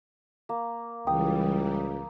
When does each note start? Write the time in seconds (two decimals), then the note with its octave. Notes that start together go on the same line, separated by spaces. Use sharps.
0.49 A#3
1.07 C#2 E3 G3 G5 D#6